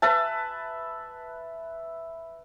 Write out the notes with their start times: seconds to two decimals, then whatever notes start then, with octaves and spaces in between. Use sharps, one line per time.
0.02 B4 E5 A5